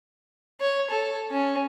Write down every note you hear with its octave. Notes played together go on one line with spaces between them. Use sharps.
C#5
A4
C#4